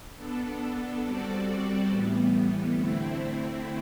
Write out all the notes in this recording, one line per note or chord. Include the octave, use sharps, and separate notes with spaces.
B3 D4 A4
G3 C4 F#4 A4 D5
A2 E3 G3 B3
D3 A3 C4 E4